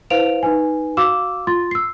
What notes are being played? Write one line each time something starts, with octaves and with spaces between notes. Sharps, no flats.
E4 B4 C5 F5 D7 F7
D#4 B4 G#5
F#4 F5 D6 E6 E7
F4 C6 A6
E6 C7